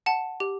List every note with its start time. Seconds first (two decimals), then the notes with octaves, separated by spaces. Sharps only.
0.06 F#5 A5
0.40 G4